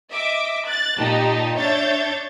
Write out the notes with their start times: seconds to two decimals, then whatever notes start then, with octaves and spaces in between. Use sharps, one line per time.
0.11 D#5 E5 D6
0.67 F#6 A6
0.97 A#2 D#4 G4 A5
1.57 D4 C#5 E5 G6 A6